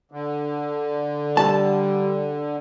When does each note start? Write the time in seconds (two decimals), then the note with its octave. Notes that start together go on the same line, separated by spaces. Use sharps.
0.12 D3
1.37 G3 A5